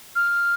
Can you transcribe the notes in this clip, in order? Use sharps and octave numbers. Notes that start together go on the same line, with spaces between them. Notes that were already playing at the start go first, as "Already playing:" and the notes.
F6